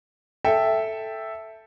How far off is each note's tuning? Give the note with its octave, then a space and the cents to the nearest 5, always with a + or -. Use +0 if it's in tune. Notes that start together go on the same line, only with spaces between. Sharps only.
A4 +0 E5 +0 G5 +0